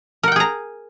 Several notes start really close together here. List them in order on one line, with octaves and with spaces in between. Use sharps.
A#4 F#5 G5 G#4 A#5